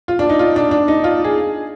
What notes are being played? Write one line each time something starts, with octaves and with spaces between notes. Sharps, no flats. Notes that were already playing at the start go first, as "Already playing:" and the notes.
F4
D4
D#4
F4
D4
D4
D#4
F4
G#4